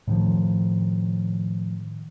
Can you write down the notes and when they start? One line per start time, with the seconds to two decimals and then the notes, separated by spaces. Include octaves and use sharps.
0.07 A2 D#3 F3